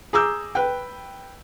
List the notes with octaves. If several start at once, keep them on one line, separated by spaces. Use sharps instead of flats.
G#4 A#5 D6 E6 G6
B4 G5